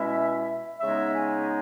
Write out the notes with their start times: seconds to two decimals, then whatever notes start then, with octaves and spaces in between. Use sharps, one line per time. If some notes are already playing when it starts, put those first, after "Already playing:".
Already playing: B2 G#3 C#4 E4 E5
0.79 C#3 G#3 B3 D#4 E5
1.15 G#5